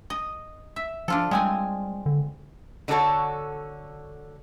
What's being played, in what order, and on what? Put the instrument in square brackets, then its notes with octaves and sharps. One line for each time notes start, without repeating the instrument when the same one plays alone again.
[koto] D#5
E5
[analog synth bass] F3 [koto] D4 F4 A4
[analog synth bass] G3 [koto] G#3 C4 G#5
[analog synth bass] D3
[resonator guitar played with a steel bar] D3 D4 F#4 A4 C#5